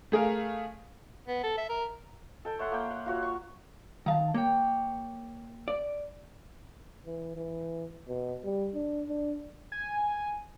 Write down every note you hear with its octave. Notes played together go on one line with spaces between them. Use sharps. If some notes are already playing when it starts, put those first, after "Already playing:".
A3 G#4 A#4 F5
B3
A4
E5
A#4
A4 G5 A5
C#5 E5 F#5 C6
A#3 G5
F#5
F4 F#4 C#5
C#6
D#3 F5 A5 A#5
A#3 C#5 G5
D5
E3
E3
B2
G3
D4
D4
G#5